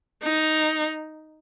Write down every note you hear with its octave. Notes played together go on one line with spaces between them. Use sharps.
D#4